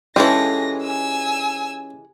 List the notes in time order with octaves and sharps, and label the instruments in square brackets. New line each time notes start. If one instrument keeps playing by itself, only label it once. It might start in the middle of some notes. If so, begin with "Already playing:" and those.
[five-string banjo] E3 G#3 [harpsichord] C#4 F4 C#5 [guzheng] G4 A4 [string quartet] A#6
[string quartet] G#5 E6